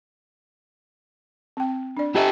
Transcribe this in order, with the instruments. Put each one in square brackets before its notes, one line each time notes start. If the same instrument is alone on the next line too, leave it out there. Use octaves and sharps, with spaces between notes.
[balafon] C4 G5
D4 D5
[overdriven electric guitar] G4 A4 [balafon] D#5 E5 A#5